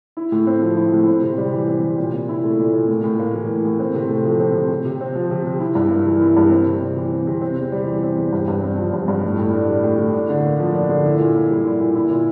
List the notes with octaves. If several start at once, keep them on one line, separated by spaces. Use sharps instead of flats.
E4
A2
C4
F3
E4
A2
C4
C3
G3
E3
C4
C3
A#2
A#2
E4
A3
A#2
A#2
A2
A2
A#3
E3
A2
A2
C4
C3
A3
F3
C4
C3
C3
C3
C4
F3
C3
C3
E4
G2
A#3
E3
E4
G2
C4
C3
G3
E3
C4
C3
C4
E2
G3
E3
C4
E2
G2
G2
C4
F3
G2
G2
A2
A2
D4
G3
A2
A2
D4
D3
A#3
F3
D4
D3
E4
A#2
A#3
G3
E4
A#2
E4
A#2